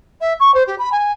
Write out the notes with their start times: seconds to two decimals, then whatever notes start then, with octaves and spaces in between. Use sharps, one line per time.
0.20 E5
0.40 C#6
0.54 C5
0.67 G4
0.78 B5
0.92 G#5